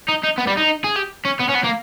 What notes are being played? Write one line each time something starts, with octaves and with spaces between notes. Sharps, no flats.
D#4
D#4
B3
G3
D#4
G#4
G4
C#4
B3
C#4
B3
A#3